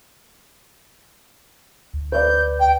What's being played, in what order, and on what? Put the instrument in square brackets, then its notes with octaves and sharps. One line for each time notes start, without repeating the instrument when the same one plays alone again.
[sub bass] D2
[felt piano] B4 D5 [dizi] G6
[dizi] G5